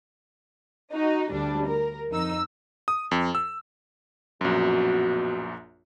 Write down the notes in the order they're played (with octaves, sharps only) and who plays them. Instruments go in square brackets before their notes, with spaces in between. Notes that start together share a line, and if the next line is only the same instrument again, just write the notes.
[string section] D#4 F#4
D2 G3 D4
A#4
F2 D#4 E6
[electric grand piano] D#6
F2
E6
[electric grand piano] A#1 F#2 [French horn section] B2 F#4